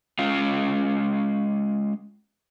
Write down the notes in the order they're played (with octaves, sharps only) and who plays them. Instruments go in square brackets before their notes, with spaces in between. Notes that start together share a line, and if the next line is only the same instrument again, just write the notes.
[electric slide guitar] G#3 C#4 F4 F5